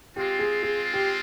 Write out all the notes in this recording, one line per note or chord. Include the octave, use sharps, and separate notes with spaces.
G#3 C4 F4 G4
G#4
G#4
G4